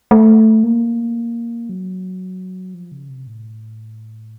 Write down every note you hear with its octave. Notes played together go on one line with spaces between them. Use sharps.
A3
A#3
F#3
F3
C#3
C3
A2